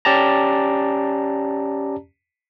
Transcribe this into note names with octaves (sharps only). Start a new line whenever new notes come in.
C#4 G4 D5 A5 A#5